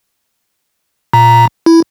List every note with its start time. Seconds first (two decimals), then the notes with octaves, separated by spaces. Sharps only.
1.13 A#2 A#5
1.66 E4